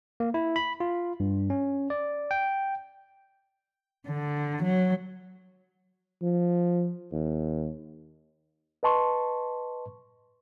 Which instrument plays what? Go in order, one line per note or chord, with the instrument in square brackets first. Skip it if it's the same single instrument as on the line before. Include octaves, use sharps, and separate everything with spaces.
[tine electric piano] A#3
E4
B5
F4
G2
C#4
D5
G5
[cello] D3
F#3
[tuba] F3
D#2
[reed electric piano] B4 D#5 A5 C6 C#6